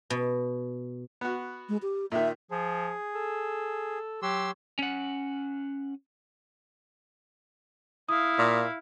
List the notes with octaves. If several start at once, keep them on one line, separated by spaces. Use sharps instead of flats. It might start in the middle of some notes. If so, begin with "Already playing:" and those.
B2
B3 F#4
G#3
G4
A#2 D#3 E5
F3 G#4
A4
F#3 G4 C6 E6
C#4 F#5
E4 F5 D#6
A#2